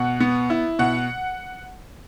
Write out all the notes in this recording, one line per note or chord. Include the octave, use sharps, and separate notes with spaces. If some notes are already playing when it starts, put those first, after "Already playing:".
Already playing: B2 F#5
B3
E4
B2 F#5